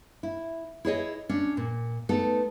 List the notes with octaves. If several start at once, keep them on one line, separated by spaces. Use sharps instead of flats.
E4
E4 G#4 C#5 D#5
C#4 D4
A#2
A3 B3 D#4 A4